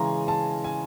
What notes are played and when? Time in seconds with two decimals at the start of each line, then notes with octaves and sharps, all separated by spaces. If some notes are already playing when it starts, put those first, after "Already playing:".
Already playing: C#3 E3 G#3 C#4 G#5 A#5 C6
0.28 A5
0.64 G#5